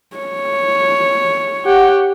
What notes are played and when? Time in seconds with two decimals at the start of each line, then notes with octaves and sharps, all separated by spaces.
0.16 C#5
1.66 G4 F#5